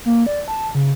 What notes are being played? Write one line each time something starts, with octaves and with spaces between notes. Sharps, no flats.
A#3
D5
A5
C#3